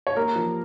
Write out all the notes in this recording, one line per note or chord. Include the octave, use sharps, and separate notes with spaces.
C#5
A#3 A#4
F3